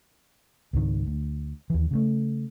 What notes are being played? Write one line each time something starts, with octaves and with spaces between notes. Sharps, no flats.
C#2 G#2 D#3
D2
D#2 E3
C#3 F#3 A3